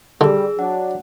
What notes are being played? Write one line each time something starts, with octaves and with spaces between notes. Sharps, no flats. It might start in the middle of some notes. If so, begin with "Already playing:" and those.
D3 G3 G#4 E6
F#3 D4 F#5